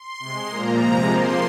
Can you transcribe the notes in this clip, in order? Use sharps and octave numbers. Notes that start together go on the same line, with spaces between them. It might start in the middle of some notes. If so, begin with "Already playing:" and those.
Already playing: C6
C3 G#3
A#2 F3 A#3 A#5
C3 F3 G#3 A#5
C3 F3 A#3 C6